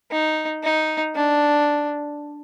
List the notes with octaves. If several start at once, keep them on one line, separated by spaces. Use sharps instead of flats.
D#4
D#4
D4